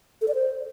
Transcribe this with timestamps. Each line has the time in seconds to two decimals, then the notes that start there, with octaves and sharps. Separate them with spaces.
0.22 A4
0.28 D5
0.35 C5